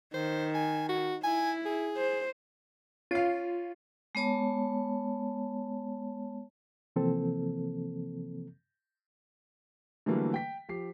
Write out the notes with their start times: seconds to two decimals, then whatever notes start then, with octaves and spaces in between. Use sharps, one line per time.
0.14 D#3 C5
0.54 G#5
0.89 F#4
1.24 E4 G#5
1.66 G#4
1.97 C5
3.11 C#4 F4 F5
4.15 G#3 B3 C#5 A5
6.96 C3 E3 F3 A#3 C4 A4
10.06 D3 E3 F#3 G3 A3 A#3
10.34 G5 B6
10.69 F3 G4 C7